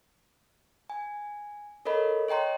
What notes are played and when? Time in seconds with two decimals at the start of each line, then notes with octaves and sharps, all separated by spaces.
0.90 G#5
1.85 A4 A#4 C#5 D#5 B5
2.28 C#5 D#5 G5 A#5 C6